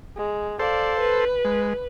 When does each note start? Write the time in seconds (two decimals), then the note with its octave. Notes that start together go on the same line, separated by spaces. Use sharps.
0.17 G#3
0.59 A4 C5 D5 F5
1.00 B4
1.45 G#3